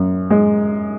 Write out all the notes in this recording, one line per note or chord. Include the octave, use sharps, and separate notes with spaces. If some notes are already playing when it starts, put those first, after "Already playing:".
Already playing: F#2
G#3